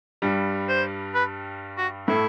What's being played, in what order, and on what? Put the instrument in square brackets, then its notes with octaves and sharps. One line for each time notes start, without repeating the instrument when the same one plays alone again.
[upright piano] G2 G3
[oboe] C5
B4
F#4
[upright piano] A2 A3 [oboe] E4